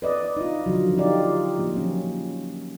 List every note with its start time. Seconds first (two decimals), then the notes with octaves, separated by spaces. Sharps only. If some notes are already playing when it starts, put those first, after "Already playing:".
0.02 B4 D5 D#5
0.37 D#4 F4
0.66 D3 F3 F#3
0.98 D#4 F4 G4 D5
1.59 F3 A#3
1.74 F#3 C#4